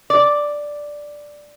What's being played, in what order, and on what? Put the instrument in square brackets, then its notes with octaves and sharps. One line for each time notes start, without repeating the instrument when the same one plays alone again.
[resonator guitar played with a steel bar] D5